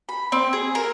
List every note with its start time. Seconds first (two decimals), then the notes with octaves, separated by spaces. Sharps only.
0.09 B5
0.32 C4
0.53 G#4
0.75 A#4